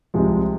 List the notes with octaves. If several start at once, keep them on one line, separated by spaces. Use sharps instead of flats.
C2 C3 F3 G#3